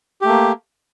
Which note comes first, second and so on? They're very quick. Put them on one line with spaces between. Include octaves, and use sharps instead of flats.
G4 A3 A#3